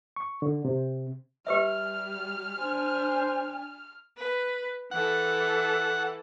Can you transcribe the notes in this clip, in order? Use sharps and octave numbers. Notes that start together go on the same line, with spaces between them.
C#6
D3
C3
G3 G4 B4 E5 F6
D4 C5 G#5
B4
E3 A4 F#5